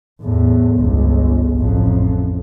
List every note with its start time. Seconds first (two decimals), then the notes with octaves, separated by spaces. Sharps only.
0.21 E2 A2
0.76 G1 C#2
1.57 A1 F2